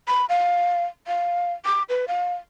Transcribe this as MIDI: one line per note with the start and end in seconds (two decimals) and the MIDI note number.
0.08 0.25 83
0.29 0.85 77
1.07 1.53 77
1.65 1.82 86
1.89 2.05 71
2.08 2.34 77